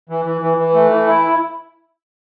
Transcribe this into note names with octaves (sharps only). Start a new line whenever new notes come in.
E3
E3
E3
E3
A3
E3
E4